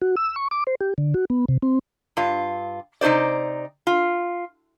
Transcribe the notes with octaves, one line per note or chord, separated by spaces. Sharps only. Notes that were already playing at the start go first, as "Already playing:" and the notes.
F#4
E6
C#6
D6
C5
G4
D3
F#4
B3
C3
C4
G2 F4
C3 D#4 G#4 C5 D5
F4